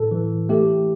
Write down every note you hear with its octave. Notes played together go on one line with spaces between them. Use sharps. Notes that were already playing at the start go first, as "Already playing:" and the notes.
Already playing: A2 A4
E3
A3 G4